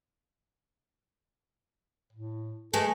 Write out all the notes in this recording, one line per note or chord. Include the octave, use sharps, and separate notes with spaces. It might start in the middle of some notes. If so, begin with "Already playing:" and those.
A2
E3 G#3 A3 A4